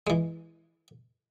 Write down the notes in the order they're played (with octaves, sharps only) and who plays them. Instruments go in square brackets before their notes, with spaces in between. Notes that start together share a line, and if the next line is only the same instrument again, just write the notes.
[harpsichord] E3 G#3